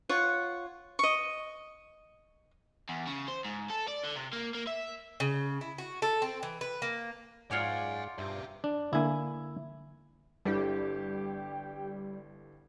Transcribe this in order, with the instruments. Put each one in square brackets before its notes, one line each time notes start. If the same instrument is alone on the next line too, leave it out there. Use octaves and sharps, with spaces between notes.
[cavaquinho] F4 C#5 F#5
D#5 C#6
[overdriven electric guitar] E2
C#3
C5
G#2
A4
D5
D3
C3
A#3
A#3
E5
[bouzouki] C#3
E4
F#4
A4
C4
E3
B4
A#3
[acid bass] G#2 [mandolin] F4 C#5 D5 [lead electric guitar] F#5 G#5
[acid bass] G2 [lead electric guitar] G4 E5
[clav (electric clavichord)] D4
[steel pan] D3 A#3 [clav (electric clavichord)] E4 G#5
[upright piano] G1 D3 E4 [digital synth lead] G3 [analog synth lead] G4